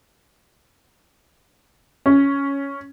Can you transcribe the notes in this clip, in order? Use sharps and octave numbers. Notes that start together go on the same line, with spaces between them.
C#4